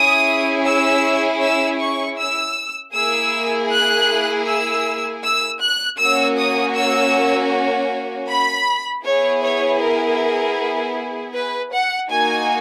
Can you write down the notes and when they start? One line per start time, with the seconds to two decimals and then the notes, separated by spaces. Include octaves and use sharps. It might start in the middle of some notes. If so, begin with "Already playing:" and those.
Already playing: C#4 E4 G#4 D#6
0.65 E6
1.41 E6
1.80 C#6
2.18 E6
2.94 A#3 E4 G#4 E6
3.70 F#6
4.47 E6
5.23 E6
5.61 F#6
5.99 A#3 C#4 F#4 E6
6.37 D#6
6.76 E6
8.28 B5
9.05 B3 E4 G#4 C#5
9.43 C#5
9.81 A#4
11.34 B4
11.72 F#5
12.09 A#3 D#4 F#4 G#5